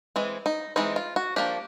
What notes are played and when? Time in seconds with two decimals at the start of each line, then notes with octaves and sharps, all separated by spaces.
0.16 E3 G#3 C4
0.46 D#4
0.76 E3 G#3 C4 D#4
0.96 F4
1.16 F#4
1.36 F3 A#3 D4 G4